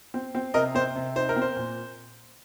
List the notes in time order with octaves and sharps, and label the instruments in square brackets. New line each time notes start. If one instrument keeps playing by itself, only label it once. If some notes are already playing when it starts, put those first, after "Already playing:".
[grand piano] C4
C4
C3 A#4 D#5
C4 C5
C3
D#4 C5
A#4
C4
C5
A#2